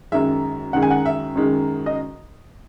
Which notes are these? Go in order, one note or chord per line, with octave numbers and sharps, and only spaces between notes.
F#2 D#3 G#3 E5
F#2 D#3 G#3 F#5
G#5
F#5
E5
F#2 D#3 G#3
D#5